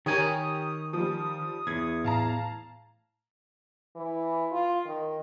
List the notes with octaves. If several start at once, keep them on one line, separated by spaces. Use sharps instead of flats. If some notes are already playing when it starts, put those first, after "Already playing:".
D#3 D#4 G4 A#4 C#5 G#5 D#6
F3 G3 D#6
E2 G#6
A2 F5 A5 A#5
E3
F4
D#3